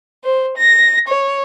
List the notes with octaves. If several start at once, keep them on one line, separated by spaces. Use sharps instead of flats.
C5
A#6
C#5